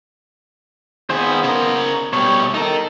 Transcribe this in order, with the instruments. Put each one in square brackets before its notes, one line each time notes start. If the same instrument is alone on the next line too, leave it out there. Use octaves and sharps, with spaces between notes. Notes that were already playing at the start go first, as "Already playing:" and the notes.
[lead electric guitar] D#3 G#4 [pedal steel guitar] B3 F4 C5
[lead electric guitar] C#3 A#4
[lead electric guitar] B2 G3 [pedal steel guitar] C#5
[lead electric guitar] D#4 A#4 [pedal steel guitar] A4